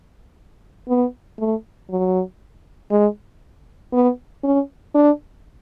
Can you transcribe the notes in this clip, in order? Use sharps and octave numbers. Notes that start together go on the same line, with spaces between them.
B3
A3
F#3
G#3
B3
C#4
D4